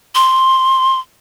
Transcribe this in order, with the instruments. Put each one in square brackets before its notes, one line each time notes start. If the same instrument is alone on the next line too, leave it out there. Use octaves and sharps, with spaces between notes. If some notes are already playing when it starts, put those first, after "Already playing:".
[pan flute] C6